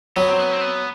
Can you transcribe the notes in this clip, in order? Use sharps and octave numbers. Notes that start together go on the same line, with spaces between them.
F#3 B3
C4
B3
C4
B3